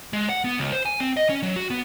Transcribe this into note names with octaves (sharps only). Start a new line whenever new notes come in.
G#3
F#5
B3
C#2
C5
G#5
C4
D#5
C#4
F#3
F#4
B3